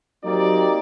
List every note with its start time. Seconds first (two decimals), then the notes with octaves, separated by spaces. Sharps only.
0.24 F#3 A#3 C4 D#4 G4 D5